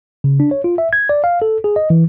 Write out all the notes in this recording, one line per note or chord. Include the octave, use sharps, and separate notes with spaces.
C#3
D4
C#5
F4
E5
G#6
D5
F5
A4
G#4
D#5
E3